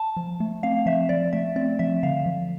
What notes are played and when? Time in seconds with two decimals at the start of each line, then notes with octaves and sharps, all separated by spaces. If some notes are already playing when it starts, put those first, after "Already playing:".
Already playing: A5
0.17 F3
0.40 A3
0.63 C4 F5
0.86 F3 E5
1.09 F3 D5
1.33 A3 E5
1.56 C4 D5
1.79 F3 E5
2.03 D3 F5
2.26 F3